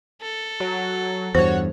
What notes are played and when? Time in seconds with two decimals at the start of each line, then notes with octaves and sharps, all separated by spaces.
0.22 A4
0.60 F#3
1.35 E2 G2 F#4 C5 C#5